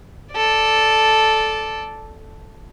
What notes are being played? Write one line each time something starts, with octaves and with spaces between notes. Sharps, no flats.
A4 D5